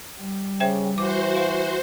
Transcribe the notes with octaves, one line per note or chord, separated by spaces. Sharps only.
G3
C#3 C5 E5 G5
E3 F#4 C5 D6
F5 C6